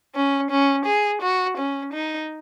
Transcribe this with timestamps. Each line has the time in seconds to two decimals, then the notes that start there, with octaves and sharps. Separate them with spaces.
0.15 C#4
0.50 C#4
0.86 G#4
1.22 F#4
1.57 C#4
1.93 D#4